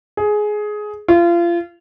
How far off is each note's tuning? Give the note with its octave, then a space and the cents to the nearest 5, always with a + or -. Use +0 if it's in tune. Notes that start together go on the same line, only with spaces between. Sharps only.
G#4 +15
F4 -30